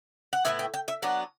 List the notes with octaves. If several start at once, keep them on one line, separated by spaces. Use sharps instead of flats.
F#5
A2 E3 B3 E4 E5
G5
G5
E5
F#3 B3 D4 F#5